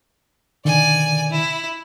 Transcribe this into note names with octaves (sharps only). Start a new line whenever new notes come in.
B2 D3 D#3 D5 G#5
E4